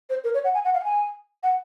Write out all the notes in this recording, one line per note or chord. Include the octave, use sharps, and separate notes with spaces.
C5
A#4
C#5
F#5
G#5
F#5
F5
F#5
G#5
F#5